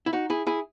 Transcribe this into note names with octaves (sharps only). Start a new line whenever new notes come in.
E4
D#4 F#4
E4 G#4
E4 G#4